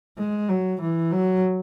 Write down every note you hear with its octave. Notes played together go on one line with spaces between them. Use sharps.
G#3
F#3
E3
F#3